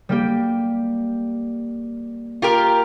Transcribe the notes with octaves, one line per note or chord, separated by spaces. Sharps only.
G3 A#3 G4
F4 G4 A#4